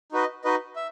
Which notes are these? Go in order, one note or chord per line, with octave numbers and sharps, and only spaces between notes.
D#4 F#4 B4 D#5
D#4 F#4 B4 D#5
E5